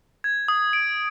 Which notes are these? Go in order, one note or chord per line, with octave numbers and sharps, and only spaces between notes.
G#6
D#6
D7